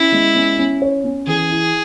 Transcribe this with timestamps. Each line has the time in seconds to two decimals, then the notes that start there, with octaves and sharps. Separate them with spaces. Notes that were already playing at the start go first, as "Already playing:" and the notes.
Already playing: C#4 E4
0.12 G#3
0.35 C#4
0.58 C#4
0.82 C#5
1.04 C#4
1.27 E3 G#4
1.50 E4